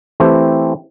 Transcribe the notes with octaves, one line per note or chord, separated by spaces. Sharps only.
E3 A3 C4 E4 G4